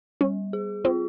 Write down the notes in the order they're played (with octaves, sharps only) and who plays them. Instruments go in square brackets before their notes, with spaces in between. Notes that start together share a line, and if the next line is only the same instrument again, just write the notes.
[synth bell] G3 [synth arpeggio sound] C#4
[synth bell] G#4
[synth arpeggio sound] C4 [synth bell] F4